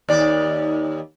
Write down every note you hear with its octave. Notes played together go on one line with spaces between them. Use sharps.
D#2 D5